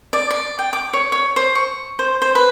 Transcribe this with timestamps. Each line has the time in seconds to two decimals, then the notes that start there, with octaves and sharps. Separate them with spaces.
0.13 D5
0.31 D5
0.59 G5
0.73 D6
0.93 C#5
1.12 C#5
1.36 C5
1.55 C#6
1.99 C5
2.22 C5
2.35 B4